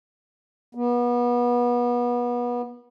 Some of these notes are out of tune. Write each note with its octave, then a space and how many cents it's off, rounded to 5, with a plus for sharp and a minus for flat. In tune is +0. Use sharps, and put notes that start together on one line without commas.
B3 -30